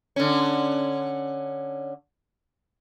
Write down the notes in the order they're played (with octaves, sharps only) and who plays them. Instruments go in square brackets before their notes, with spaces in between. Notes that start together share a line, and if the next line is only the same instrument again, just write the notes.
[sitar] D3 C#4